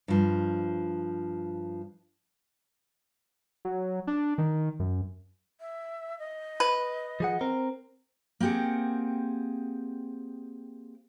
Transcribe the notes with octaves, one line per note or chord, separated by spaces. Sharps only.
G2 F3
F#3
D4
D#3
F#2
E5
D#5
B4
F3 G#4 F#5
C4 A#4
A#3 C4 G4 G#4 F#5